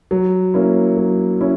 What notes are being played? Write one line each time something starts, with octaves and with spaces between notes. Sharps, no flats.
F#3
A#3 C#4 E4
F#3
C#4 E4